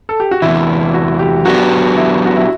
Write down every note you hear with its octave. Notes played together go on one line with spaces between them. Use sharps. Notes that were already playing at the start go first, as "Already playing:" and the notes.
A4
G4
F#4
E2 C3 E3 E4
F#4
G4
F#3 B3 D4 F#4 G4
E4
F#4
E4